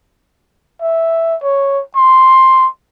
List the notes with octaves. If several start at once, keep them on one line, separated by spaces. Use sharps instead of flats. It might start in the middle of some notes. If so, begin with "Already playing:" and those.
E5
C#5
C6